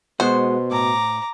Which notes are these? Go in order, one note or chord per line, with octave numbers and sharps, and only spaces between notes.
B2 G#3 B3 F#4 C5
A2 A#5 D6